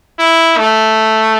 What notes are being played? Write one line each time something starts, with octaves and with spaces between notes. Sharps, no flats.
E4
A3